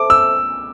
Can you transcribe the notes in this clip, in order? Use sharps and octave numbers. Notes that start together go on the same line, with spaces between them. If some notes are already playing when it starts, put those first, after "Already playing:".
Already playing: A4 C5 E5 A5 D6
E6